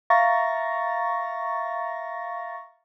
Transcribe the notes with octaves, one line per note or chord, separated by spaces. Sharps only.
E5 F5 A#5 C#6 A6 A#6